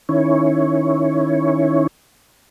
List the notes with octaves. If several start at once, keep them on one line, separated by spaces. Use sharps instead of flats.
D#3 C#4 E4 C#5